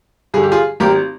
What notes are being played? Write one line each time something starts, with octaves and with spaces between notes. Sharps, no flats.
G2 D3 G#4
G4
F4 G#4
G#1 G4 A#4